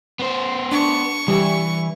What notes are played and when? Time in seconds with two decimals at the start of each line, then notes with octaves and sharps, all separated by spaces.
0.19 B3 C5
0.72 D4 C#6
1.28 E3 G3